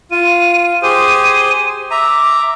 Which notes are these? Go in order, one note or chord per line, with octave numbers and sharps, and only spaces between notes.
F4 D#7
G4 G#4 C5 D#7
E5 A#5 D6